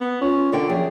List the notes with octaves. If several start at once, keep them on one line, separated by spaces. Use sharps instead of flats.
B3
C#4 F4
D3 A#3 D5 G5
F#2 F3 G#4